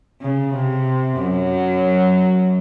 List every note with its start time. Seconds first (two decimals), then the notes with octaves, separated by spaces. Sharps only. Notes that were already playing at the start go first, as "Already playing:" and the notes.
0.22 C#3
0.55 C3
1.21 F#2 F#3